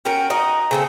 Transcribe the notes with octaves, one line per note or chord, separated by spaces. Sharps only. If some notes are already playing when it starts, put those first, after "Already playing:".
C#4 F#4 A#4 G5
D#4 F#4 D#5 A#5
C#3 C4 A4